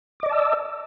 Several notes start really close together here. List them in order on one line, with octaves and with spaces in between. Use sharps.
D6 D#5 D5 A5 E6